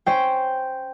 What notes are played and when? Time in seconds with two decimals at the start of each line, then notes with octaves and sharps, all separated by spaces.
0.06 C#4 C5 G5